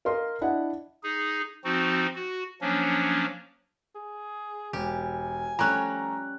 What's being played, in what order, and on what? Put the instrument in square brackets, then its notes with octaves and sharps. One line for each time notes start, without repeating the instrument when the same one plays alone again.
[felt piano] A#4 D#5 F5 C6
D4 E4 D#5 F#5
[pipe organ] D#4 G#4
F3 C4 D#4 F#4
F#4
F3 F#3 A#3 C#4 D4
[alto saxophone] G#4
[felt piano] E1 [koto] G4 [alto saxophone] G#5
[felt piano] F3 A3 [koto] G3 C#4 [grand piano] A#5 F#6